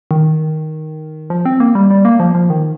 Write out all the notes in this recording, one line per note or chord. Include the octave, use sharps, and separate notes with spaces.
D#3
F3
C4
A#3
G3
G3
A#3
F3
F3
D#3